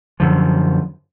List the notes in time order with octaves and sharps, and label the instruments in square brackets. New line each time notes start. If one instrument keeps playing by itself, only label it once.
[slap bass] F#2 D3 F3